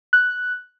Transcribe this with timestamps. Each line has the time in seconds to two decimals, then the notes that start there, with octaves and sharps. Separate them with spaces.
0.13 F#6